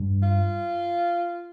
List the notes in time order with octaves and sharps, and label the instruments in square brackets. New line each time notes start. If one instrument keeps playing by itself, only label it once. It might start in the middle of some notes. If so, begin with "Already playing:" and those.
Already playing: [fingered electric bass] G2
[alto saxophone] F4